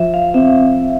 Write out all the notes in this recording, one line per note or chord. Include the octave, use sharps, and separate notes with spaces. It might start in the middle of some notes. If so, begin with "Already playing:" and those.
Already playing: F3 E5
F5
C4 E5